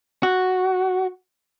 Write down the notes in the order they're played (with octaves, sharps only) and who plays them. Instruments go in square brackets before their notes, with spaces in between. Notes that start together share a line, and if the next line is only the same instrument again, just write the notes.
[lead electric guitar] F#4